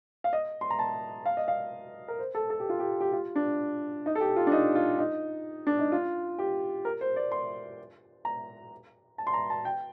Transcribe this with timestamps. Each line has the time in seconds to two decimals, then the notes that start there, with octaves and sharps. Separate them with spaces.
0.24 F5
0.33 D#5
0.61 C6
0.70 A#5
0.79 A5
1.26 F5
1.37 D#5
1.48 F5
2.08 A#4
2.19 C5
2.35 A4
2.50 A4
2.60 G4
2.69 F4
2.79 G4
3.00 G4
3.13 F4
3.36 D4
4.06 D#4
4.15 A4
4.21 G4
4.36 F4
4.47 D4
4.52 D#4
4.75 F4
4.99 D#4
5.67 D4
5.79 D#4
5.92 F4
6.38 G4
6.85 A#4
7.01 C5
7.16 D5
7.32 C6
8.25 A#5
9.18 A5
9.27 C6
9.34 A#5
9.50 A5
9.65 G5